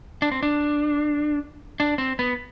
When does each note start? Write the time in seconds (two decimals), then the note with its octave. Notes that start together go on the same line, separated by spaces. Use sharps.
0.22 D4
0.32 C4
0.43 D4
1.80 D4
1.98 C4
2.19 B3